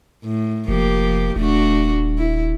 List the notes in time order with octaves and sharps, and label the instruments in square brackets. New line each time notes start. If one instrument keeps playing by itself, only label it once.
[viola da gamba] A2
[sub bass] F1 [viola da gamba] F3 A#3 G4
[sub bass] D#1 [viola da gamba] A3 D4 F#4
[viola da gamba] E4